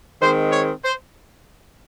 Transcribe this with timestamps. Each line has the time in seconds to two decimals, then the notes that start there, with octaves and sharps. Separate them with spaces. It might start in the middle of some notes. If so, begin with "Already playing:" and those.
0.21 D#3 G#3 C4 C5
0.52 C#5
0.83 C5